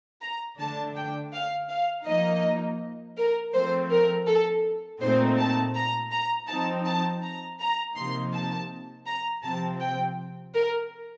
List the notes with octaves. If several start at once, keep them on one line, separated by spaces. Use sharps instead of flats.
A#5
D3 A3 D4 A5
G5
F5
F5
F3 A#3 D#4 D#5
A#4
F3 A3 C4 C5
A#4
A4
A#2 A3 C4 D#4 C5
A5
A#5
A#5
F3 C4 D#4 A5
A5
A#5
A#5
C3 F3 A#3 D#4 C6
A5
A#5
C3 F3 C4 A5
G5
A#4